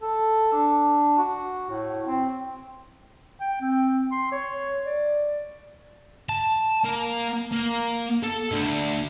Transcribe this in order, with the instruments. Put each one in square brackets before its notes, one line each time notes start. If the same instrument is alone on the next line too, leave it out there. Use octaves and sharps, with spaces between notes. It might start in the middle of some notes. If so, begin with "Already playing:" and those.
[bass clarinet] A4
D4
F#4
A2
C4
[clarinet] G5
C4
C6
C#5
D5
[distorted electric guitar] A5
A#3
A#3
A4
D2